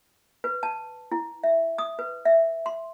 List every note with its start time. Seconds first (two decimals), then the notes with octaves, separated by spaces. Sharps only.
0.44 B4
0.63 A5
1.12 E4
1.43 E5
1.78 D#6
1.99 B4
2.25 E5
2.66 C6